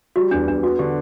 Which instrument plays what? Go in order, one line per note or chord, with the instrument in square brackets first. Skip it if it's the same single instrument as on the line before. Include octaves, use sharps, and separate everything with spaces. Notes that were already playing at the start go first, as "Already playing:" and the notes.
[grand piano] G3 [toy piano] F#4
[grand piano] E2 [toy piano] D4
[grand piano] E2 [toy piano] D4
[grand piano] B3 [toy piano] F#4
[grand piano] D3 [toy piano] G4